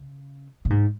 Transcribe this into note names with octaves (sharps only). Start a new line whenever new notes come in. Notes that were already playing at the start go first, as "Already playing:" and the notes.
Already playing: C#3
A#2
G#2